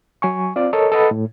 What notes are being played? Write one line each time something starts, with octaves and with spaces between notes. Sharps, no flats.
F#3 G#5 C#6
C4 F4 D5
A4 A#4 C#5 D#5
A4 B4 D#5 F#5 A5 B5
A2